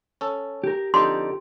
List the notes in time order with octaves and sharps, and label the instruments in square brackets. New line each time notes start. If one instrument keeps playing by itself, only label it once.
[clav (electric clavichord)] C#4 A4
[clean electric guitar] G4 A#4
[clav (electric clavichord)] F2 D3 D#4 [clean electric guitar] G4 [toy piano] C6